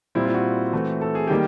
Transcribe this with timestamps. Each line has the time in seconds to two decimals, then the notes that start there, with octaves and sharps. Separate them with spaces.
0.15 A#2 G3 C4 E4
0.25 F4
0.34 F#4
0.73 E3 A3 C4
1.01 A4
1.15 G#4
1.27 D#3 G3 A#3 G4